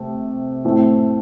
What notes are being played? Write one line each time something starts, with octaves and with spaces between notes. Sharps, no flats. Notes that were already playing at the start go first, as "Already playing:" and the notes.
Already playing: C3 A3
A2 A3 C4